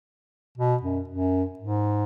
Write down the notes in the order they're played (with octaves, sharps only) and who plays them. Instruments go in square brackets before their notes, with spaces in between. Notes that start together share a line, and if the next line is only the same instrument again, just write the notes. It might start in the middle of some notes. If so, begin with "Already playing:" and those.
[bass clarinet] B2
F#2
F#2
G#2